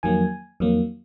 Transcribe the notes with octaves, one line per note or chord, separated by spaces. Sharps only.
F2 D#3 F#3 A#3 G#5
F2 D#3 F#3 A#3